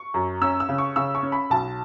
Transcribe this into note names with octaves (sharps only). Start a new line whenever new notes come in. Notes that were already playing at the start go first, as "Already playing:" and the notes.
Already playing: C#6
F#2
C#4 E6
E6
C#3
C#6
C#3 E6
C#6
C#4
B5
B1 A5